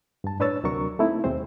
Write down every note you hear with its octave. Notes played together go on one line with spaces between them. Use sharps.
G2 A5
A2 D4 B4 C#5 E6 A6
D2 C3 F#3 D4 A#4 C#6
A3 A#3 C4 D#4 E4
D#2 B2 G#3 C4 C5